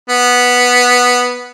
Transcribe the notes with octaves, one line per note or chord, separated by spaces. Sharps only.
B3